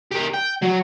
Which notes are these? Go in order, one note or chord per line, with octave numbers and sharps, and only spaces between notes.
G4 A#4
G5
F#3